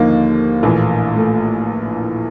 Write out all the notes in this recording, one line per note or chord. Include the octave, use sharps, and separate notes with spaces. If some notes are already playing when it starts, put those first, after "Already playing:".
Already playing: D#2 D3 F3 A#3 D#4
A#1 A2 E3
A3